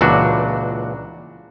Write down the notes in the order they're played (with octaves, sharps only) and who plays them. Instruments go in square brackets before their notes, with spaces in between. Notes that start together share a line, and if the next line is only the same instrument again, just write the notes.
[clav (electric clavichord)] C#2 A#2 E3 D4 F#4